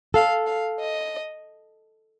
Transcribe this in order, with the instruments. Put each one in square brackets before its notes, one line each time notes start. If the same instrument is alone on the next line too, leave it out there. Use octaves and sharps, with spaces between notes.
[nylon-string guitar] A4 [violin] F5
[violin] F5
D#5